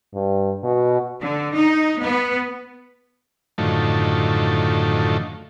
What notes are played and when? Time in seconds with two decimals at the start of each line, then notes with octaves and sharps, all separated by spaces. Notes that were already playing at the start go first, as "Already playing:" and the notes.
0.14 G2
0.64 B2
1.20 D3
1.54 D#4
2.02 B3
3.58 F#2 A2 D3 D#3 F3 A3